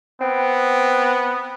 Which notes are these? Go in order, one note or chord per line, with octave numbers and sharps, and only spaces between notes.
B3 C4